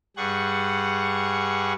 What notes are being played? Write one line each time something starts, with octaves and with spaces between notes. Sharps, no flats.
G2 G3 G#4 F#5 C#6